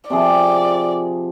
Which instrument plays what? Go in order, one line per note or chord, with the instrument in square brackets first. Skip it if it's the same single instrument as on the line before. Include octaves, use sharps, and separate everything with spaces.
[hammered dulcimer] C3 F3 G#4 [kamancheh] D5